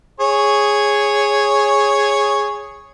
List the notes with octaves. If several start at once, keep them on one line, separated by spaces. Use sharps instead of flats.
G#4 C#5